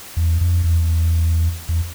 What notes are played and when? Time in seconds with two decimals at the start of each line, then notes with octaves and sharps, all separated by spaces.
0.17 E2
0.41 F2
0.64 E2
1.69 E2